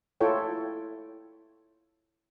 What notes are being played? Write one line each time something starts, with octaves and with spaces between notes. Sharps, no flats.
E4 F4 A4 C#5 G5